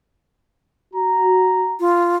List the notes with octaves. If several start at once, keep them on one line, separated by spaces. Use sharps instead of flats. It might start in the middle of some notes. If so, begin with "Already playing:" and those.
F#4 A#5
F4